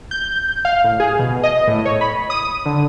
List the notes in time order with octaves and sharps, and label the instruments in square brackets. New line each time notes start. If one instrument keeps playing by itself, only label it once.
[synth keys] G6
F5
A2
G#4
B2
D#5
A2
C#5
B5
D#6
D3